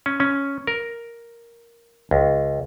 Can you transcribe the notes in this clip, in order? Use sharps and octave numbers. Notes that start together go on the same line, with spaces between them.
C#4
C#4
A#4
C#2